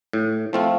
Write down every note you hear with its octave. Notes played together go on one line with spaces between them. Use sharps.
A2
F3 A3 C4 F4